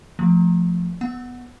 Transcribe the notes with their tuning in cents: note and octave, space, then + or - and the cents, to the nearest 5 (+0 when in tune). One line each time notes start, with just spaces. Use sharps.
F3 +0 A3 +5
B3 +0 F#5 +0